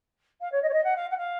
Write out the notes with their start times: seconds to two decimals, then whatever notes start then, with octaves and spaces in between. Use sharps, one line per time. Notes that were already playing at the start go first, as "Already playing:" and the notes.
0.40 F5
0.51 C#5
0.62 D#5
0.68 C#5
0.73 D#5
0.83 F#5
0.95 F5
1.10 F#5
1.17 F5